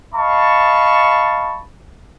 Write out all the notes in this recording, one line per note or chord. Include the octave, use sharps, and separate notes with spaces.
D#5 F5 A5 B5 C#6